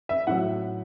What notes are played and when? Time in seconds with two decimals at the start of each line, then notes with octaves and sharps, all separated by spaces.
0.09 E5
0.27 A2 F#3 F#5